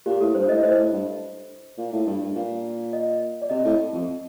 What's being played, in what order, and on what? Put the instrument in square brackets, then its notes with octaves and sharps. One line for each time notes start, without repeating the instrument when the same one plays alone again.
[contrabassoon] A#2 [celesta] G4
[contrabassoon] A2 [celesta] A4
[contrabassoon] G2 [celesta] C5
[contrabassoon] A2 [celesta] D#5
[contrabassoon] A2 [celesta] C5
[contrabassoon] A2
G2
A#2
A2
G2
G2
A#2
[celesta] D#5
D5
[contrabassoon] C3 [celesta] D#5
[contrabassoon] A2
F2